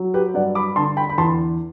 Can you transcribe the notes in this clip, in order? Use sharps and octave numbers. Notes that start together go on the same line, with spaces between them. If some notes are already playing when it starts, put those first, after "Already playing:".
Already playing: F#3
G4 B4
G2 D5 F#5
B5 D6
D3 A5 C6
G5 B5
B5
E2 A5 C6